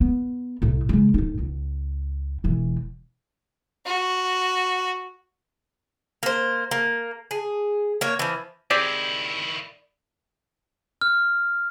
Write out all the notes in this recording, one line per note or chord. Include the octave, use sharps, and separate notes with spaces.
B3
C2 A2
C#3 G#3
D1 D#4
C#2
E1 E3
F#4
A#3 C5
A#3
G#4
A#3 C#5
E3 F3
D#3 C4 E4 G4 G#4 D5
F6